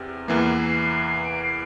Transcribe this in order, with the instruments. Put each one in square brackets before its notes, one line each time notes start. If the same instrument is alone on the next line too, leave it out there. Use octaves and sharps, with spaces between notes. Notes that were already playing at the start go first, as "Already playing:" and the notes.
Already playing: [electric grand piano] E2 C3 [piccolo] F6
[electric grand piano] E2 E3 A#3 [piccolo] C7
[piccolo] C7
D7
C7